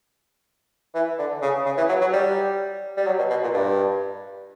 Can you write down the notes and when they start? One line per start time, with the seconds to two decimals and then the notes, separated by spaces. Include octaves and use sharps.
0.94 E3
1.18 D3
1.42 C#3
1.66 C#3
1.77 E3
1.89 F#3
2.01 F#3
2.13 G3
2.97 G3
3.06 F#3
3.19 B2
3.30 B2
3.43 A#2
3.53 G2